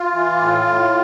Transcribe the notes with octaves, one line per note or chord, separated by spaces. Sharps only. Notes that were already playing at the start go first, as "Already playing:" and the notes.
Already playing: F4
E3
A2
A2